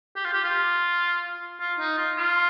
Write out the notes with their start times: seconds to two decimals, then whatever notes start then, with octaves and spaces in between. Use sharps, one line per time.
0.16 G4
0.25 F4
0.33 G4
0.44 F4
1.60 F4
1.79 D#4
1.98 F4
2.18 F4